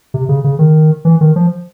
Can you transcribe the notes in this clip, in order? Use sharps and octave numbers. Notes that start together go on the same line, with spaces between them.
C3
C#3
C#3
D#3
E3
D#3
F3